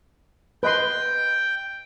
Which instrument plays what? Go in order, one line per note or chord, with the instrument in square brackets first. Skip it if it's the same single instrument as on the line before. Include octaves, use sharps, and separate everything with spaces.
[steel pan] B4 D#5 C6 [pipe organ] G5